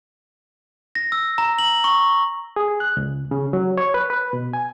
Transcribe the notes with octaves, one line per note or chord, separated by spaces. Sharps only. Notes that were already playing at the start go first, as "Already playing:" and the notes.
A#6
E6
A#5
F#7
C#6
G#4
F#6
C#2
C#3
F#3
C#5
B4
B4
B2
G#5